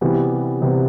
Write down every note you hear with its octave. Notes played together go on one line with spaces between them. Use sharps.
C3 E3 G3 B3
C3 E3 G3 B3